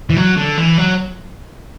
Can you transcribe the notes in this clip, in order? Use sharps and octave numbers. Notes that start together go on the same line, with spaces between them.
E3
F#3
D3
E3
F#3